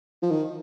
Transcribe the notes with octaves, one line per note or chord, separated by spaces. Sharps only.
F3
D#3